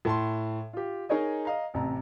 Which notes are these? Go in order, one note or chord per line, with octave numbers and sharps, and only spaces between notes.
A2 A5 C6
F4 G4
D#4 G#4 A#4 C#5 D#5
D#5 F5 A#5
A1 C3 A5 A#5